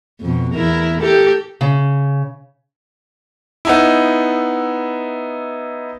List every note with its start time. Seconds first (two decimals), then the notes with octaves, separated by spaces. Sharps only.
0.21 F2 B2
0.54 E2 E4 A#4
1.02 G4 A4 A#4
1.61 C#3
3.65 B3 D#4 E4